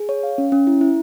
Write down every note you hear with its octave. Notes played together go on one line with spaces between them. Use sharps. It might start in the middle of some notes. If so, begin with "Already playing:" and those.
Already playing: G#4
C#5
F5
C#4
C#4
E4
E4